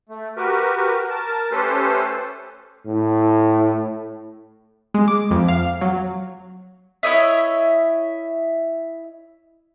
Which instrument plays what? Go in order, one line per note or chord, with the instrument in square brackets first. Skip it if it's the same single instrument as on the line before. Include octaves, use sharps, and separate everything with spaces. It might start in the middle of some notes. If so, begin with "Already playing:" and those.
[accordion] A3
F#4 G4 A#4 B4
A#4 A5
A3 C#4 G4 A4 B4 C5
[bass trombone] A2
[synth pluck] G#3
D6
F2
F5
F#3
[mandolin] E4 C#5 D#5 E5